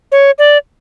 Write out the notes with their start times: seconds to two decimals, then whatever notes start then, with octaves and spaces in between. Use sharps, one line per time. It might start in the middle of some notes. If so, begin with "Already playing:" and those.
0.12 C#5
0.38 D5